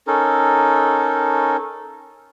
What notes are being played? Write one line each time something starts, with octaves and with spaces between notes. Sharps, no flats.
C#4 D#4 A4 A#4